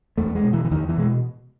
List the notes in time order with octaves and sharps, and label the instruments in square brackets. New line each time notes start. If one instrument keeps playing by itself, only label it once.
[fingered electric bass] E2 A3
G#3
B2
E3
E3
E2 D#3
E3
B2 G#3